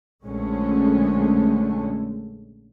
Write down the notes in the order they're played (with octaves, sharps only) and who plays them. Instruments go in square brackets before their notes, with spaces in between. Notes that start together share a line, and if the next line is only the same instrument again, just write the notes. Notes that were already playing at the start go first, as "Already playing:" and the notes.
[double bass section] A#1 D3 G#3 A3 C#4